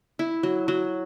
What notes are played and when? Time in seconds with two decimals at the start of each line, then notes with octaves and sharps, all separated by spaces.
0.19 E4
0.43 F#3
0.68 F#3